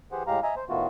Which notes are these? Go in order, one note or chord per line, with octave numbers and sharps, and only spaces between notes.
E3 G4 G#4 C5 F#5
A2 G#3 G4 F5 A#5
D#5 E5 G#5 A#5
C5
A2 D#3 A3 B3 F4 F#4